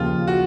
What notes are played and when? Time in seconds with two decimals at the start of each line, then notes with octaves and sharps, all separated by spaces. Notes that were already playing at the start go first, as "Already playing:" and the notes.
Already playing: D#2 C#3 F3 F4
0.27 F#4